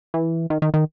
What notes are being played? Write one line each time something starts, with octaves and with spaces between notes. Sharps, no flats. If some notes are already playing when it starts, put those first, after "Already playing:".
E3
D#3
D#3
D#3